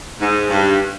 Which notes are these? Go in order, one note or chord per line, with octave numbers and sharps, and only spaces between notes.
G#2
G2